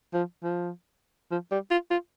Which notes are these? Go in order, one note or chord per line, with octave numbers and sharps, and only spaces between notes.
F3
F3
F3
G3
F4
F4